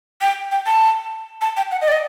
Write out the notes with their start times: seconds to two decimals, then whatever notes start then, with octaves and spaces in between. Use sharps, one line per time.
0.22 G5
0.52 G5
0.66 A5
1.41 A5
1.57 G5
1.71 F#5
1.82 D#5
1.88 D5
1.92 D#5